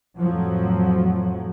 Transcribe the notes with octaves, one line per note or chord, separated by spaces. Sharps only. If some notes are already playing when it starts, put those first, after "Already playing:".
F2 A2 F3 F#3